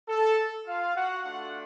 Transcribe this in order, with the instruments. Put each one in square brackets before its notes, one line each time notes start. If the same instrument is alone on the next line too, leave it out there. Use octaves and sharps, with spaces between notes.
[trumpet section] A4
F4 F5
F#4 F#5
A3 D4 F4 F#4 F#5